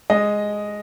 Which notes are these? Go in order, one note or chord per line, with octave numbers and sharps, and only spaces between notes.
G#3 D#5